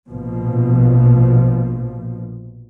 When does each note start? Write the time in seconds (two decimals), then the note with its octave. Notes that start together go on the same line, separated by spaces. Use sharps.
0.10 A#1 B2 F3